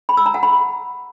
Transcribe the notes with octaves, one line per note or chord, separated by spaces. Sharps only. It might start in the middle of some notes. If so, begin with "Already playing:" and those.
B5
E6
A#5
F#5
B5